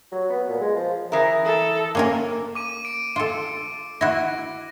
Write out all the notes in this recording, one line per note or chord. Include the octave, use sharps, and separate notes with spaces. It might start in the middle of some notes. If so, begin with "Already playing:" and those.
F#3
B3
A#2
G#3
F3
E3 A#4 E5 D#6 A#6
A4
A#3 C#4 A#4
D6 D#7
D7
F4 A4
E4 F#4 A#6